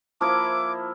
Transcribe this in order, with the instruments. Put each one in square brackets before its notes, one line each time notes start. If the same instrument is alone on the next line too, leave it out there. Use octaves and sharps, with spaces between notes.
[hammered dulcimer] F3 A#3 E4 [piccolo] D6